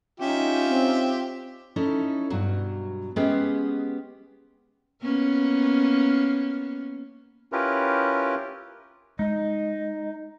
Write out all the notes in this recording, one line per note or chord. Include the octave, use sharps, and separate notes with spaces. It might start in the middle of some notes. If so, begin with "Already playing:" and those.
C#4 D#4 F4 G4 E5
C4
C#4 D#4 E4 A4
G2 B2 F#3
G#3 B3 C#4 G4 G#4 B4
A#3 B3 C#4
C#4 E4 F4 G4 A#4 B4
G#3 D#4 D#5